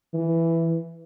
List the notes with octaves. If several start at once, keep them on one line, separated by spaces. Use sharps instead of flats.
E3